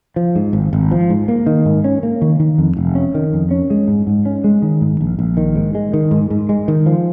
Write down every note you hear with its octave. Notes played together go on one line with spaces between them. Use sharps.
F3
G#2
G#1
G#1
F3
G#2
A#3
D#3
G#2
C#4
A#3
D#3
D#3
F2
F1
C#4
D#3
F2
C#4
G#3
G#2
G#2
C#4
G#3
D#3
G#2
A#1
A#1
D#3
G#2
G#3
D#3
G#2
G#2
G#3
D#3
F3